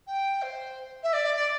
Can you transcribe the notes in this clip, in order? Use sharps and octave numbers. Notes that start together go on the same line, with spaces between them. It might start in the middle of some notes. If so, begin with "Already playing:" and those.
G5
C5
E5
D5
D5